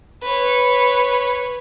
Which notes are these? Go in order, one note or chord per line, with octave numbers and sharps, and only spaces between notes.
B4 C#5